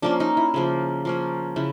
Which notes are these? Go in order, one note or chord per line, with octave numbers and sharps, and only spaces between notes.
F3 A#3 C#4 D4
D#4
E4
C#3 F3 A#3
F3 A#3 C#4
C#3 E4